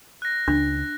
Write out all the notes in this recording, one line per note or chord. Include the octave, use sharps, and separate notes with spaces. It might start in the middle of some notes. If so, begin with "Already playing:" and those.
F#6 A#6
C#2 D4